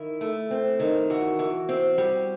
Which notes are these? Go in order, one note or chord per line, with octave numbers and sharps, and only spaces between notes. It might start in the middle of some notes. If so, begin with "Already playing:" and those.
Already playing: D#3 E4
A3
C4
D#3
E3 F#4
E3
C4
G3